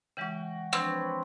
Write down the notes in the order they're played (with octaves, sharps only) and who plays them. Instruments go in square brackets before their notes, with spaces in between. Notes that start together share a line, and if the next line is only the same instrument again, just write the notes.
[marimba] C#3 E3 G#3 [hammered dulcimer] F#4 G5
[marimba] F3 D4 [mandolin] C4 [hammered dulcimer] B4 C#5